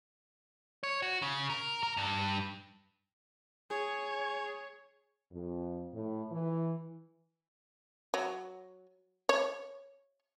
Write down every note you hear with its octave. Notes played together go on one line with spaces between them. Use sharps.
C#5
F#4
C#3
A#4
A#4
G2
G#4 C#5
F2
A2
E3
F#3
C#5